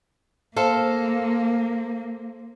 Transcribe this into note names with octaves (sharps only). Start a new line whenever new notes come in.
A#3 A4 C5 F5